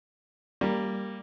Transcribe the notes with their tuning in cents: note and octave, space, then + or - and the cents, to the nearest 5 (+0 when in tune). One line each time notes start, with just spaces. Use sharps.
G3 +0 A#3 -10